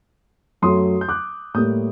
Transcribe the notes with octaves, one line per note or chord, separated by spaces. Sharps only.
F#2 F#3 A3 C6 D#6
G6
D6 F#6
A2 G3 A#3 D#6 G6